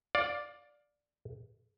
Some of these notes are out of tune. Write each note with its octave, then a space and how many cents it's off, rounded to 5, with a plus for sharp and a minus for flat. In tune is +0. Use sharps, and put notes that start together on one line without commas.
D5 +0 F5 +25